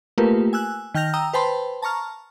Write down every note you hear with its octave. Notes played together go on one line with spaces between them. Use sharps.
A3 A#3 F4 G4 A#4 B4
G#5 E6 F#6
D#3 G5 F6 G6 A#6 F7
G5 A#5 D#6 E6
B4 C5 G5 A5 B5 C6
A5 A#5 C#6 F6